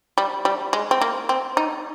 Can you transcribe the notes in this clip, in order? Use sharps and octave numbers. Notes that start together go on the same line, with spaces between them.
G3
G3
G#3
C4
A#3
C4
D#4